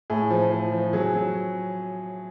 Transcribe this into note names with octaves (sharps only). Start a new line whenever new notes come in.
A2 G#4
F3
F3
F3
F#3 G#4
F#3